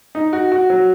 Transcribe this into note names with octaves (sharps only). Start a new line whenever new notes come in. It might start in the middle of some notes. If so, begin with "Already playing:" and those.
D#4
F#4
F#4
F#3